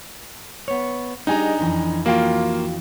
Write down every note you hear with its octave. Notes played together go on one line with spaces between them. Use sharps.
B3 C#5
G3 D4 D#4 G#4 D#5 G#5 A#5
F2 E3 F3
A#3 F4 F#4 F5 G5